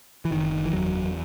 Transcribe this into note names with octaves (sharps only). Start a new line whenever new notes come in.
E3
F#1 D#3
E3
E2 F#3